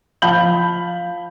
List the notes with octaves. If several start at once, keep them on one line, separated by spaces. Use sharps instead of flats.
F3 F5 A5 B5 G6 F#7